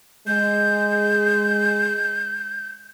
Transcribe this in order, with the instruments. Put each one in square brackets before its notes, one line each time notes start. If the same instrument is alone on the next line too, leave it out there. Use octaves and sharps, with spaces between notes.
[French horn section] G#3 [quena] G6